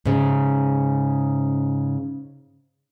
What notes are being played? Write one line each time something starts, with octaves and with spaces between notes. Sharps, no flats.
G#2 C#3